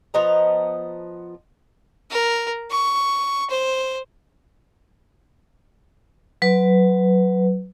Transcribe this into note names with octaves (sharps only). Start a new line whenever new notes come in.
F3 B3 D#5 A#5
A#4
C#6
C5
F#3 B4